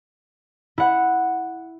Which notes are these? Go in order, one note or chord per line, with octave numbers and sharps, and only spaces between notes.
E4 F#5